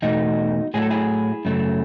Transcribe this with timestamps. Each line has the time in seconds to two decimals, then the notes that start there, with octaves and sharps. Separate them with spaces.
0.02 E2 B2 A3 D#4 F#4
0.74 A2 F#3 A3 G#4
0.82 A4
0.90 E4 G#4
1.45 F#2 C#3 F#3 A3